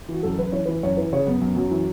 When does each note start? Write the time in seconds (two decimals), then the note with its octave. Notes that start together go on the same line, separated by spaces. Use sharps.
0.09 E3 F#4
0.23 F#2 A4
0.39 F#2 B4
0.52 E3 C#5
0.65 E3 B4
0.83 F#2 C#5
0.97 E3 B4
1.13 C#3 C#5
1.27 F#2 B3
1.41 F#2 B3
1.56 F#2 F#3
1.71 E3 F#3